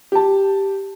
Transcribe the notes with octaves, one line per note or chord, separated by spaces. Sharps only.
G4 A5